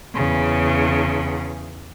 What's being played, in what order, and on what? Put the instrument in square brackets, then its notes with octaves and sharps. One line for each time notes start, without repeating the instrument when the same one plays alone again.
[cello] E2 C#3